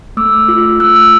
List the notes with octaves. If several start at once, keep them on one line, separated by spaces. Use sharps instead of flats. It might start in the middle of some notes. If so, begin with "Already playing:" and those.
A3 D6 E6
F4
A3 E6 F#6
E6 F#6